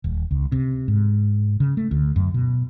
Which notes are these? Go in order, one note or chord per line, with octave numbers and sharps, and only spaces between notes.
D#1
C#2
C3
G#2
C#3
A3
D2
F#2
B2